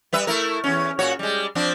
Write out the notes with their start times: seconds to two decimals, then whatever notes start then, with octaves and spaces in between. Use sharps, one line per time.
0.13 G3 B4 E5
0.27 A3 E4 A#4
0.64 E2 C#4
0.99 A#2 F#4 C#5
1.19 G3 G#3
1.55 F3 C4 D4